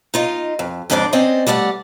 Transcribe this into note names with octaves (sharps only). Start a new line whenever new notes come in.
D#4 F4 D#5
F2
F2 G#2 D3 D4 C5 D5
C4 C#4 C5 D5 D#5
G3 A3 D5 E5 F#5